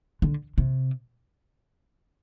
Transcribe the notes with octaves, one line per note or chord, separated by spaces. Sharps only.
D3
C3